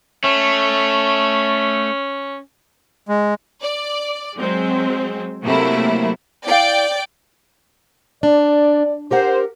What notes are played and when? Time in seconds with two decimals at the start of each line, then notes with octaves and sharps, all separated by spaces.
0.24 A3 C#4
3.08 G#3
3.61 D5
4.36 F#3 G#3 C4
5.43 C3 F#3 A3 A#3 E4
6.47 E4 D5 F5 G5
8.23 D4 D5
9.11 G4 A#4 C5 F#5